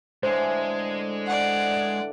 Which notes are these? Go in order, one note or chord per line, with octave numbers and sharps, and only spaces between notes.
A2 D3 E3 G#3 C5
D5 F#5